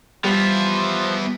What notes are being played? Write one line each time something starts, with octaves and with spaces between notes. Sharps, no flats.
F3 G3 B3 G4 E5